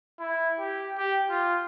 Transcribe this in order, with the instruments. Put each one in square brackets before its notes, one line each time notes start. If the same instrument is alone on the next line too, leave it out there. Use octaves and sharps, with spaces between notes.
[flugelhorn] E4
G4
G4
F4